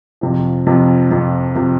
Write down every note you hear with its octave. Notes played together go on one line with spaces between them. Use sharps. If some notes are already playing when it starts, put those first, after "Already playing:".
F2 C3 F3
F2 C3 F3
F2 C3 F3
C3 F3